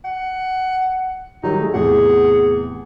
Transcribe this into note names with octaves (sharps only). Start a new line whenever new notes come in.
F#5
D#3 F#3 G3 D#4
A3 G#4
E2 A2 C3 G#4 F#5